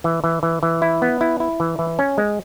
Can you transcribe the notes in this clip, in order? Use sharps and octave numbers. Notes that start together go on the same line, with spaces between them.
E3
E3
E3
E3
E4
B3
E4
E4
E3
E3
C#4
G#3